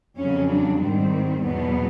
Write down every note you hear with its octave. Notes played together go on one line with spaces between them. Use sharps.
F2 C#3 F#3 C#4
D4
G#2 D#3 G3 C4
E2 B2 F#3 B3